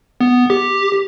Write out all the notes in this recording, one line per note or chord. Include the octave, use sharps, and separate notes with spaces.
B3
G4